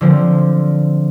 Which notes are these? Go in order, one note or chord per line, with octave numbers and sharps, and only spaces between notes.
D3 F3 C4